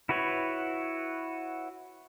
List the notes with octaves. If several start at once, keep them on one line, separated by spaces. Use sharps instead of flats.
E4 F#4 B4 C#5